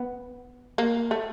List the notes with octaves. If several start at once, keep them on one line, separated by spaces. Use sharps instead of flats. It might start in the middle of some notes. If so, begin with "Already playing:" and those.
Already playing: B3
A#3
A3